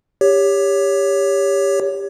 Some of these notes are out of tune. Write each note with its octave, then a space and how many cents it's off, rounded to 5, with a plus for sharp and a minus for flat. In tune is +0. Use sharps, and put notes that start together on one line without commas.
G4 +20 C#5 +15